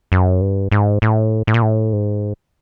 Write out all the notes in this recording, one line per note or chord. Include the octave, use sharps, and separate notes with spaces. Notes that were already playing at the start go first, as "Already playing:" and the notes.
F#2
G2
G#2
A2
A2
A#2
A2
G#2